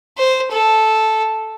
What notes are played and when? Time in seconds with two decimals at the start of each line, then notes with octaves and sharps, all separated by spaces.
0.17 C5
0.51 A4